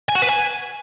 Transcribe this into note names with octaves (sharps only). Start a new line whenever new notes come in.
G#5
F#4
B4
G#5